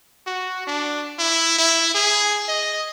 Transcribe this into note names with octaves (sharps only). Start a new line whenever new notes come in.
F#4
D4
E4
E4
G#4
D#5